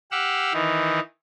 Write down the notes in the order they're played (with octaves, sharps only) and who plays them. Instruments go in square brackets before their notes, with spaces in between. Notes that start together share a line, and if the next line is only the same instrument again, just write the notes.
[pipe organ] G4 F5 F#5 E6
D#3 E3 D#4